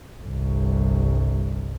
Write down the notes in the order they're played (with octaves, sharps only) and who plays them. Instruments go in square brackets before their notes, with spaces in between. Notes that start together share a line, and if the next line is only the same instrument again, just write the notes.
[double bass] G1 C2